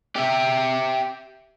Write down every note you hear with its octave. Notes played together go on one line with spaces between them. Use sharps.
G4 E5